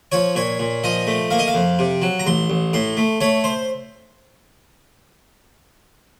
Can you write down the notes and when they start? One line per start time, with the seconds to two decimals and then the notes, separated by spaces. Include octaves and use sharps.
0.12 F3 C#5
0.35 A#2 C#5
0.59 A#2
0.84 F3 D#5
1.07 A3
1.31 A#3 F5
1.39 D#5
1.48 F5
1.54 F2
1.79 C3
2.02 F#3
2.20 A#5
2.26 A1 C6
2.50 A1
2.73 A2 C6
2.97 A3
3.21 A3 C#5
3.44 C5